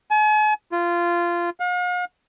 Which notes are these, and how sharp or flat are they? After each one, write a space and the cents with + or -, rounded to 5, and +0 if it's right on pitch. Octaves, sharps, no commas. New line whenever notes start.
G#5 +45
F4 -15
F5 +45